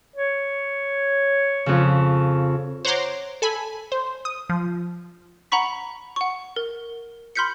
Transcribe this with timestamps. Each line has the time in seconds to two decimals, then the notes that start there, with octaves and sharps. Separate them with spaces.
0.16 C#5
1.66 F2 C#3
2.85 C5 C#5 F#5 A#5 C6 D6
3.42 A4 G#5 B5
3.92 C5
4.25 D#6
4.49 F3
5.52 F#5 A#5 B5 C#6 B6
6.16 F#5 C#6
6.56 A#4
7.35 B5 C6 F6 G6 B6 C#7